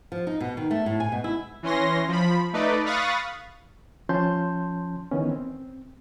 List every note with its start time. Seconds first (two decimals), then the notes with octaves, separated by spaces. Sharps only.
0.12 F3
0.27 D#4
0.40 B2
0.57 D#3
0.71 A3
0.86 A2
1.00 G#5
1.12 B2
1.24 E4
1.63 E3 C#4 C6 A#6
2.08 F3 B5
2.53 A3 D#4 B4 D5
2.85 F5 B5 C#6 D#6 F#6 A6
4.09 F3 C#4 A5 C6 G6
5.11 D#3 E3 B3 C#4
5.31 C4